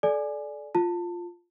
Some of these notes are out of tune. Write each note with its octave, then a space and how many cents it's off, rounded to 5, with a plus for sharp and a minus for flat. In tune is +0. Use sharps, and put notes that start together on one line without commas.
A4 -30 D5 +0 G#5 +10
F4 +0 A5 +25